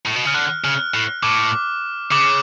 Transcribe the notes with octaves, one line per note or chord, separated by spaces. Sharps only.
A2
B2
C#3 F6
D3 F#6
C#3 F6
A2
A2 D6
C#3 D6